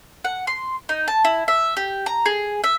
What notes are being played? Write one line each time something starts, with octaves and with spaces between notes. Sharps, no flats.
F#5
C6
D#4
A5
E4
E5
G4
A#5
G#4
E5